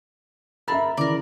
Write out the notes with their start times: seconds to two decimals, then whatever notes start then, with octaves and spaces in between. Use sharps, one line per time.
0.68 C4 A#4 E5 A#5 B5 A6
0.97 C#3 E3 A#4 D5